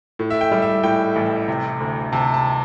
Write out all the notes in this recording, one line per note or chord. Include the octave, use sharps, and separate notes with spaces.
A2
E5
G5
G3
E5
A2 G5
A1
C3
D2
C3 A5
A5